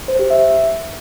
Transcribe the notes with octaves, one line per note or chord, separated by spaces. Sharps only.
C5
G4
E5